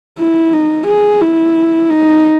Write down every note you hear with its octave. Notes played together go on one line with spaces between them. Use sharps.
E4
D#4
G#4
E4
D#4